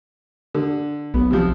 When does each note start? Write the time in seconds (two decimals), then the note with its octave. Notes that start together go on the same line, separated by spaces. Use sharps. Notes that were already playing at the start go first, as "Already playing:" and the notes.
0.54 D3
1.14 B1 B3
1.31 C3 F3